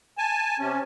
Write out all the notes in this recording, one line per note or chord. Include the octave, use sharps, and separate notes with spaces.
G#5 A5
C3 C#4